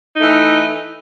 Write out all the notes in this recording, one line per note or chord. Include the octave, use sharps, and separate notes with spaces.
E3 A3 D#4